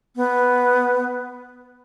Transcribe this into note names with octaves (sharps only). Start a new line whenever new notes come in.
B3